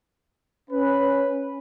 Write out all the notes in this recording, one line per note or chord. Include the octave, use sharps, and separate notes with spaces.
C#4 B4